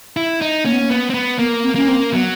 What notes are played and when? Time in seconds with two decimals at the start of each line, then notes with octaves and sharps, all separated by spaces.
0.17 E4
0.41 D#4
0.65 A#3 C#4
0.74 B3
0.80 A#3
0.90 B3
1.10 C4
1.14 B3
1.39 A#3 B3
1.63 C4
1.75 A#3 C#4
1.88 C4
2.13 F#3 B3